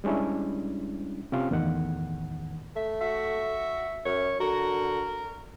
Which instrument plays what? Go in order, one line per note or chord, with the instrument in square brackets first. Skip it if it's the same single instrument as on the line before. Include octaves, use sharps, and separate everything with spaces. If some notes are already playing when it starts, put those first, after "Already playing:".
[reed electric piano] G3 G#3 C#4 D4 E4
C3 C#4 F4 F5
E2 A2 D#3 F#5
[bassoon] A3 [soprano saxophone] E5
[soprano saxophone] F#4 [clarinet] E5
[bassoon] F#2 [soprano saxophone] C#5
[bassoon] D3 [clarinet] F#4 [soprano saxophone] A#4